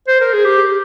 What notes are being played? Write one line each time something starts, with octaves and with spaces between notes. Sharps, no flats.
C5
A#4
G#4
G4